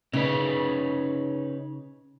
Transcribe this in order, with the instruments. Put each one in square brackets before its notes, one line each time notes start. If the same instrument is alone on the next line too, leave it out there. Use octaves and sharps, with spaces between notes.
[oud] C#3 [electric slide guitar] C#4 D#4 B4